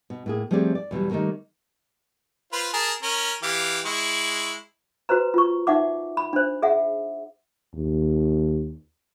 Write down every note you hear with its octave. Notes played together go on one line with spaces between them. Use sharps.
B2
A2 A#3 G#4
F3 G3 A3 C4 G#4 D5
D5
E2 B2 F#3 G3
D#3 G3 A3 A#3
F4 B4 C5
G#4 A#4 A5
C#4 A#4
E3 G4 F5
G#3 E4 C#6
F#4 B4 C5 A#5
F4 C#6
D#4 E5 F#5 D6
B5
D4 C5
G#4 E5 F#5
D#2